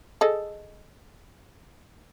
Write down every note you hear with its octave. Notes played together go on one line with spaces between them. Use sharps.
G#4 A4 D#5